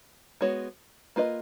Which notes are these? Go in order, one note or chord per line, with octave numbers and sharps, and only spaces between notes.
G#3 B3 F#4 C#5
A#3 F4 B4 D#5